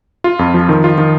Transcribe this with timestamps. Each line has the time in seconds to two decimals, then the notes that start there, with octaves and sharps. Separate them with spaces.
0.24 F4
0.39 F2
0.54 F3
0.69 D#3
0.84 F4
0.98 D#3